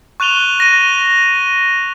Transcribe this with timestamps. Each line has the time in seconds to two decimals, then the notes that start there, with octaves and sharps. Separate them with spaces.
0.20 C#6 F#6 D#7 F7 G7
0.60 A#6 D#7